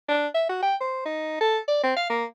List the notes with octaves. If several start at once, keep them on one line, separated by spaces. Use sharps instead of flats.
D4
E5
F#4
G5
C5
D#4
A4
D5
C4
F5
A#3